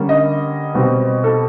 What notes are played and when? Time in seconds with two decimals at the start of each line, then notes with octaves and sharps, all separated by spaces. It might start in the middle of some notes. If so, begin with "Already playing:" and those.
Already playing: D3 G3 A#3 C#4
0.09 D#5
0.74 B2 G3 C4
1.24 A4